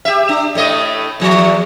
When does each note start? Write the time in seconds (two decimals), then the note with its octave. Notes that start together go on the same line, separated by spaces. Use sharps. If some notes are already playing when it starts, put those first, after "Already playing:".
0.05 G4 E5
0.29 D4
0.55 A2 A3 D#5
1.20 E2 F3